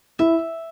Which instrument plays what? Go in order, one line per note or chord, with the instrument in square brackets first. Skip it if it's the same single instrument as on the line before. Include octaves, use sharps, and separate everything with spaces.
[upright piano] E4 [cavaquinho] E5